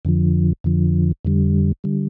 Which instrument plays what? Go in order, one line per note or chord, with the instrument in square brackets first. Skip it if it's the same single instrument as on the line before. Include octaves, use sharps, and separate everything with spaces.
[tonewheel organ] F2 D3 F3
F2 D3 F3
F2 D3 G3
D3 G3